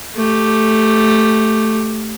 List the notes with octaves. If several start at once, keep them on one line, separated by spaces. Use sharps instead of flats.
A3 G4